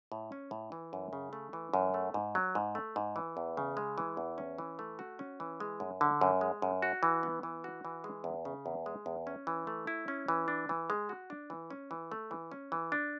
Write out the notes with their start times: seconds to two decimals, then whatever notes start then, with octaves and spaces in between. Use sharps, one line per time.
0.12 A2
0.32 C#4
0.51 A2
0.72 E3
0.93 F#2
1.13 C#3
1.33 A3
1.53 E3
1.74 F#2
1.94 A3
2.14 G#2
2.35 F#3
2.55 G#2
2.75 A3
2.96 G#2
3.16 E3
3.37 E2
3.57 C#3
3.77 G#3
3.98 E3
4.17 E2
4.38 C#4
4.58 E3
4.79 A3
4.99 F#4
5.19 C#4
5.40 E3
5.60 G#3
5.80 F#2
6.01 D3
6.21 F#2
6.41 G#3
6.62 F#2
6.82 F#4
7.03 E3
7.23 B3
7.43 E3
7.64 F#4
7.85 E3
8.04 G#3
8.24 E2
8.45 C#3
8.66 E2
8.86 G#3
9.06 E2
9.27 C#4
9.47 E3
9.67 A3
9.87 E4
10.08 C#4
10.28 E3
10.48 D4
10.69 E3
10.90 G#3
11.09 F#4
11.30 D4
11.50 E3
11.70 C#4
11.91 E3
12.12 A3
12.31 E3
12.52 C#4
12.72 E3
12.92 D4